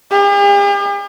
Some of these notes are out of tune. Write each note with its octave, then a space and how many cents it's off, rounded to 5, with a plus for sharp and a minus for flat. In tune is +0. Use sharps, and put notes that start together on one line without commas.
G4 +45